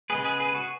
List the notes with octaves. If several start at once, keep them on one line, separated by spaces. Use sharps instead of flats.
C#3 G#3 B3 G#4 B4
G#4 B4
G#4 B4
F#4